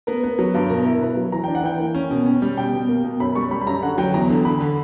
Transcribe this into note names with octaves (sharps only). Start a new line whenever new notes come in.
B3 A#4
B3
F#3
G2
B2 A#4
E4
B2 B4
F#3
E3 A#5
D4 G5
F#5
E3 G5
A#3
C#4
B2
C#4
G3
B2 G5
B2
A#3
B2
F#2 B5
G3 C#6
G3 B5
B5
F#2 A#5
D3 F#5
F#3 G5
E2 A#5
D3
D3 B5
D3